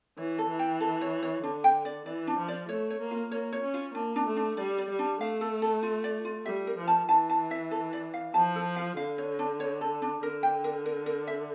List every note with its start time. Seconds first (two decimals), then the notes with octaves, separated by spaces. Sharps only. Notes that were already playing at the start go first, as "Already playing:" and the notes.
0.17 E3 C#5
0.38 A4
0.49 E3
0.59 G5
0.81 A4
1.01 C#5
1.23 C#5
1.43 D3 D4
1.64 G5
1.85 D5
2.06 E3 D5
2.27 D4
2.37 F3
2.48 D5
2.68 A3 C#5
2.90 C#5
3.00 A#3
3.11 F4
3.31 A#3 C#5
3.53 C#5
3.63 C#4
3.74 F4
3.94 A#3 D4
4.16 D4
4.26 A3
4.37 D4
4.57 G3 D5
4.78 D5
4.89 G3
4.99 D4
5.20 A3 F5
5.41 A4
5.62 A4
5.83 F4
6.04 D5
6.25 F4
6.45 G3 E5
6.67 A#4
6.78 F3
6.88 A5
7.09 E3 A5
7.30 A5
7.51 E5
7.71 A4
7.93 D5
8.14 F5
8.34 F3 A5
8.55 A4
8.76 F5
8.97 D3 F5
9.18 C#5
9.39 D4
9.60 C#5
9.81 A4
10.02 D4
10.23 D3 A#4
10.43 G5
10.64 A#4
10.86 A#4
11.06 A#4
11.27 E5